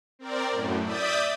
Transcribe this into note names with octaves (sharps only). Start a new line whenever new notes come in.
C4 A#4 D5
F#2 A2
D5 E5 D#6 G6 A6 B6